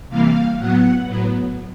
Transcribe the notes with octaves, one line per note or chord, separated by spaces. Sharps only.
C3 E3 G3 A#3 F5
A2 F#3 B3 F#5
A2 F#3 B3